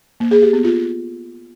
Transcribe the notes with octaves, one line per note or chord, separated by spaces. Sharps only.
A#3
G#4
G4
B3
F4